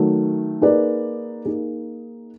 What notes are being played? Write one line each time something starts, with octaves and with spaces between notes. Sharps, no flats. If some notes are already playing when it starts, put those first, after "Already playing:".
Already playing: D#3 F#3 A3
A#3 D#4 G#4 B4 D5
A#3 D#4 G#4